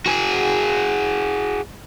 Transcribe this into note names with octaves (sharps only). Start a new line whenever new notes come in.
F#4 G#4